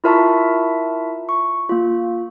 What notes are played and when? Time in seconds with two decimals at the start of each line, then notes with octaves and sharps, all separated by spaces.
0.04 E4 F4 A#4 E5 A5 C#6
1.29 C#6
1.69 A#3 F4